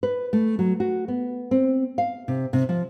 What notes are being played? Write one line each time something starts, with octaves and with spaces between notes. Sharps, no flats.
B4
A3
F#3
F#4
B3
C4
F5
C3
C3
F3